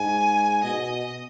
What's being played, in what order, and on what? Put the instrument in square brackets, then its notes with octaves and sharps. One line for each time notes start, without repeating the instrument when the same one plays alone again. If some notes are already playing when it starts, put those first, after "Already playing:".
Already playing: [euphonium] G#2 [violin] G#5
[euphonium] B2 [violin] D#5